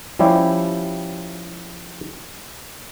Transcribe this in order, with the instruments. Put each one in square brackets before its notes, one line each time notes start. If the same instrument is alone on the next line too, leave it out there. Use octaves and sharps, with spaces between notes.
[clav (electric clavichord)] F3 G3 C#4 E4 G4